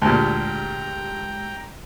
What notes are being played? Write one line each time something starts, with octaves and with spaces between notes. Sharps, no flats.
D2 A#2 G#3 G4 G5 A#5 E6